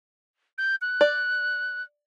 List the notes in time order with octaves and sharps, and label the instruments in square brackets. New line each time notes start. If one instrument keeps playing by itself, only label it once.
[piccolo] G6
F#6
[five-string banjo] D5